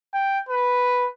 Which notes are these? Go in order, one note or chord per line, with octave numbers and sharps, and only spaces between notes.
G5
B4